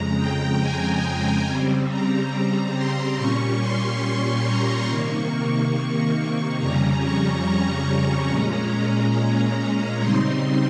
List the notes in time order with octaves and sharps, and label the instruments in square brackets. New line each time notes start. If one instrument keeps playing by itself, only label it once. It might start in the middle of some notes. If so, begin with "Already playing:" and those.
Already playing: [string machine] F2 C#3 G#3 A#5
G5
G#5
C#3 G3 C4
A#5
C6
A#2 G3 C#4 C#6
C6
A#5
C3 D#3 A#3 C#6
F2 C#3 G3 C#4 A#5
C#6
C#6
A#5
A#2 G#3 C#4
A#5
C#3 G3 C4 D#4 C6